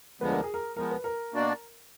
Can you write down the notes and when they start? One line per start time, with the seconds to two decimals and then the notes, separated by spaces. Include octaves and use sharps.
0.21 D2 D3 F3 G#3 B3 B4
0.31 A#4
0.44 G#4
0.54 A#4
0.77 F3 G#3 B3 A#4
0.91 B4
1.04 A#4
1.33 B2 A#3 D4 F#4 D5